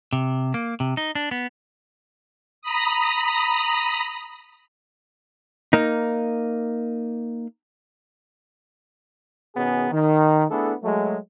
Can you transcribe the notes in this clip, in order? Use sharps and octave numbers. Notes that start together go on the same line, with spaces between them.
C3
A#3
C3
D#4
D4
B3
A#5 B5 D#6
A#3 D#4
B2 D#3 B3 C#4 G#4
D#3
A3 B3 D4 E4 G#4 A4
F#3 G#3 A3